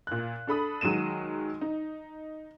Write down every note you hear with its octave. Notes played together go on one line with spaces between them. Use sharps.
A#2 F#6
D4 A4 B5 D#6
D#3 F#3 G#3 D#7 E7
D#4